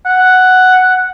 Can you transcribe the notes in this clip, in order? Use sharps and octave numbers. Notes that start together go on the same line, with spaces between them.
F#5